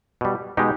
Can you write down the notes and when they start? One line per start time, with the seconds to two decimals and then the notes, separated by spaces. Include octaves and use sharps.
0.21 B2 G3
0.57 B2 G#3 D#4 G4